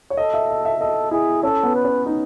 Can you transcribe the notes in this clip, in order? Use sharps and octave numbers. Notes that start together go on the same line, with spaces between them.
C#5
A4 D#5
E5
D#5
E5
A4 D#5
E4 G#4
C#4 A4
B3
B4
C#4
D#4